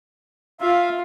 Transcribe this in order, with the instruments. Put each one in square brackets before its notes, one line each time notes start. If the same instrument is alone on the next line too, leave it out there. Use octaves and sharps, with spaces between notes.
[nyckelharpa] F4 [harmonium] E5 F5